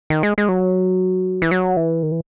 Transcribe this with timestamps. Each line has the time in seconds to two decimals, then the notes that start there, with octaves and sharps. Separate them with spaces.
0.10 D#3
0.23 G#3
0.38 G#3
0.49 F#3
1.42 E3
1.51 F#3
1.77 E3
2.03 D#3
2.12 E3